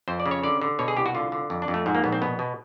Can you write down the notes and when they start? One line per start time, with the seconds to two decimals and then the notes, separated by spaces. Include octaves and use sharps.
0.08 F2 C5
0.20 D5
0.26 C#3
0.31 C#5
0.43 D3 D5
0.62 D3
0.79 B2 C#5
0.88 G#4
0.97 C2 G4
1.06 F#4
1.15 D3 F4
1.32 D3
1.50 F2
1.62 D4
1.68 F2
1.74 A3
1.86 G#2
1.95 A#3
2.04 A#1 B3
2.12 C4
2.22 B2 B3
2.39 B2